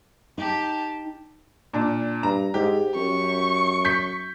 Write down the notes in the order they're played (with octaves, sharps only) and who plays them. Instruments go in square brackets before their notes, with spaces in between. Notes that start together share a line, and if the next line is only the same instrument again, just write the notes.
[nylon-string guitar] D#4 [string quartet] G4 A5
[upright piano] A#2 D4
[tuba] G2 [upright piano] A#5
[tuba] G#2 [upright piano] G4
[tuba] F#2 [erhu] C#6
[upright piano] G6 B6